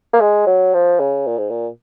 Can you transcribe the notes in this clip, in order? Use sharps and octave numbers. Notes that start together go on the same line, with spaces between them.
A#3
G#3
F#3
F3
C#3
A#2
G#2
A#2